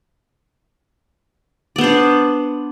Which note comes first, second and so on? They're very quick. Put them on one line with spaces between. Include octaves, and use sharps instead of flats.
D5 B3 C5 D4